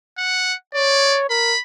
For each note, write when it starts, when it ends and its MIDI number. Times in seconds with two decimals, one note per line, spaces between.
0.18 0.54 78
0.74 1.29 73
0.74 1.20 74
1.30 1.54 70
1.30 1.61 83